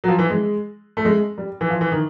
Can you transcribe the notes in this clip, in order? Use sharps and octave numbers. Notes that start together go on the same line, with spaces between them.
F#3
F3
E3
G#3
A3
G#3
G3
E3
F3
E3
D#3